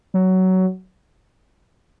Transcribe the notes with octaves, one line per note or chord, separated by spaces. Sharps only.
F#3